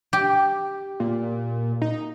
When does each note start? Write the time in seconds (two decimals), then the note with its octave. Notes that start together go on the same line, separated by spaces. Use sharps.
0.13 G4
1.00 A#2
1.82 D#4